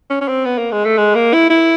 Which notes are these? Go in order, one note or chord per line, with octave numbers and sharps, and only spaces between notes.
C#4
C#4
C4
B3
A#3
G#3
A3
G#3
A#3
E4
E4